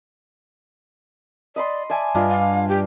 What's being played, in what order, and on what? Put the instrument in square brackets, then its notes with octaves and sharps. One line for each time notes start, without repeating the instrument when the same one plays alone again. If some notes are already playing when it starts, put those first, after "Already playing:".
[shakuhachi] D5 [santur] D#5 B5 C6
[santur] D5 E5 G#5 [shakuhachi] A5
[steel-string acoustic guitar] G2 [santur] D4 F4 D#5
[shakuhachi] F5
G4